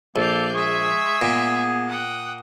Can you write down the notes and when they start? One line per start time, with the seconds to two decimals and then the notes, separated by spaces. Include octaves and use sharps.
0.16 A#1 A#3 A4 D5 F5 G6
0.54 G#3 G#4 E5 C#6
1.22 A#2 B3
1.88 F#5 G5 D#6